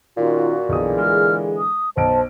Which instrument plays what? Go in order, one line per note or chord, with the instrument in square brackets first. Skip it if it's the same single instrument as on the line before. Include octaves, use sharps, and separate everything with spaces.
[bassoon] A#2 [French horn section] D#3 C#4 F4 [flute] F#4
[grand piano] B1 D#6 [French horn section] D3 E3 G#4
[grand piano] G#3 [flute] F6
[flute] D#6
[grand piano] B1 D7 [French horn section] C5 [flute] A5